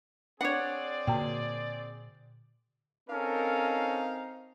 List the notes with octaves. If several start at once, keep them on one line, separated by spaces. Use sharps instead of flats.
C4 D4 G#4 C#5 D5 F#5 D6
A#2 D3 F#4 G5
C4 C#4 D#4 A4 A#4 F5